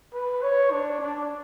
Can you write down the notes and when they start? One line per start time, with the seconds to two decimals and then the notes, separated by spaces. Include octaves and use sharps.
0.14 B4
0.43 C#5
0.72 D4
1.01 D4